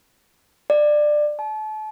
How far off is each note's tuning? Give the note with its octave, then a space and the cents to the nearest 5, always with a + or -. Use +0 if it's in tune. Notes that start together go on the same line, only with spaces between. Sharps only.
D5 +20
A5 -35